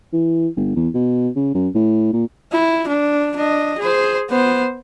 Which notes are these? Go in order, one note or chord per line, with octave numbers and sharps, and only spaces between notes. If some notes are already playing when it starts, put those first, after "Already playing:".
E3
G1
E2
B2
C#3
F#2
A2
A#2
E4
D4
D4 D#5
G#4 C5
B3 C5